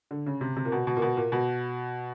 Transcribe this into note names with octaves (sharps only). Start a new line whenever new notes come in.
D3
C#3
C3
C3
A#2
B2
B2
A#2
B2
A#2
B2